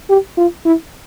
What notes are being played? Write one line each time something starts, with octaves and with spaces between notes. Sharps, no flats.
G4
F4
E4